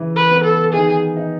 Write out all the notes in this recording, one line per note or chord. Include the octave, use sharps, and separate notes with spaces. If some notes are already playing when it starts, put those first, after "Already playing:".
Already playing: C#3 E3 E4
B4
B3
A4
D#3 G#4
D#4